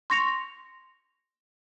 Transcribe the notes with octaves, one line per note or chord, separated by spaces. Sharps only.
C6 C#6 A#6 C#7 F7